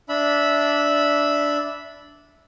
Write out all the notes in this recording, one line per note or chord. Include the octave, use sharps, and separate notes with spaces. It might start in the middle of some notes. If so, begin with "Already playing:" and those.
D4 E5 B5